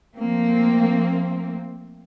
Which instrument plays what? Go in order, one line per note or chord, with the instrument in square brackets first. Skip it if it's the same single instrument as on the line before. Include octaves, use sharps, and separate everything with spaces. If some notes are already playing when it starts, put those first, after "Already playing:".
[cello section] F3 A3 A#3 C4